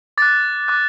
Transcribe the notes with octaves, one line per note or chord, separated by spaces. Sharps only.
D6 F#6 A6
D6 F#6